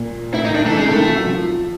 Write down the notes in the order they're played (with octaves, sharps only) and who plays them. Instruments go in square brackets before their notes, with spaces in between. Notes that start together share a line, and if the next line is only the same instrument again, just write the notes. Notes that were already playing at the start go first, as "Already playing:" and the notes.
Already playing: [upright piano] A#2
[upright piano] A2 [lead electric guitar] E4
[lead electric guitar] D#4
[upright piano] D#3 [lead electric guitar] D4
[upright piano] E3 [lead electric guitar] A3
[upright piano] C3
[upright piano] C#3 [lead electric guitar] G#3
[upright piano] D#3 [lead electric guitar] A3
[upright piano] E3
F3
F#3
F3